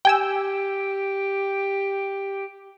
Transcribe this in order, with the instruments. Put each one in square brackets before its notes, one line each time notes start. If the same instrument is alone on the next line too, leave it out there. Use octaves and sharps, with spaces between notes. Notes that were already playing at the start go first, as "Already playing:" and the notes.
[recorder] G4 [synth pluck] G5 G#5 E6